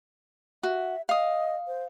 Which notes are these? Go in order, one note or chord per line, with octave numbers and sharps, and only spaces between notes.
F#4 E5
D#5 F5 D#6
C5